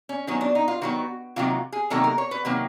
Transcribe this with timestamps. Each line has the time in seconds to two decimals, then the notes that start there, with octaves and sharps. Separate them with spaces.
0.09 C#4
0.27 D#3 F#3 B3 C#4
0.41 D4
0.55 D#4
0.68 F4
0.82 D#3 F#3 B3 F#4
1.36 C3 D#3 F#3 A#3 F4
1.72 G#4
1.90 C3 D#3 F#3 A#3 A4
2.04 A#4
2.18 C#5
2.31 B4
2.45 C3 D#3 F#3 A#3